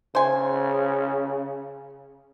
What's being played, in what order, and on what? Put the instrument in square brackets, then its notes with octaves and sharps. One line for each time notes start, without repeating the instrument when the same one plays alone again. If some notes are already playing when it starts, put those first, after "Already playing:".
[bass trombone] C#3 [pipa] C5 G#5